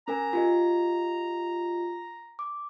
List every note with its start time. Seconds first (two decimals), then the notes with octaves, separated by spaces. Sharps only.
0.08 C#4 A#4 G#5 A#5
0.33 F4 G4 D#5
2.39 D6